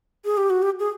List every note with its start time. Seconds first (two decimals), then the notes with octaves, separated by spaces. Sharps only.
0.25 G#4
0.37 G4
0.50 F#4
0.62 G4
0.79 G#4